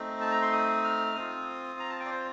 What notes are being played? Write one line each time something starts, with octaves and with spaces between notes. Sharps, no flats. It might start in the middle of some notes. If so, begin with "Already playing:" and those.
Already playing: A3 C4 D#4
A5
A#5
C6
D#6
F6
C4 F4 D#6
A#5
A5
G5
D5
C5